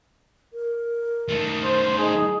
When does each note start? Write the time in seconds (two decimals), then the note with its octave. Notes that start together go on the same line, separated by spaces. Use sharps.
0.53 A#4
1.29 D#3 A3
1.64 C5
1.98 D#4 G#4